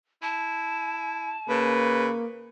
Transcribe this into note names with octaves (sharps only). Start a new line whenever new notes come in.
E4 A5
C#3 A#3 B4